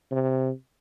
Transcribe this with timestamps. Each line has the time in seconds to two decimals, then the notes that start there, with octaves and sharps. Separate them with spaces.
0.11 C3